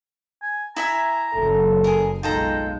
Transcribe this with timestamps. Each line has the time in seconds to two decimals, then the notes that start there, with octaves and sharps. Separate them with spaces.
0.42 G#5
0.76 E4 E5 G#5 A#5
1.34 F#1 F#2 A4
1.84 G#4 A#4
2.23 B1 G#3 D#4 F4 A4 G5 A#5